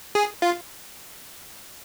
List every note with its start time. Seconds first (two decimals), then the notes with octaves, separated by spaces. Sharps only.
0.15 G#4
0.42 F4